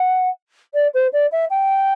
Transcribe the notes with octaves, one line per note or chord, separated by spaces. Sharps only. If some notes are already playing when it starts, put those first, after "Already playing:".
Already playing: F#5
D5
C5
D5
E5
G5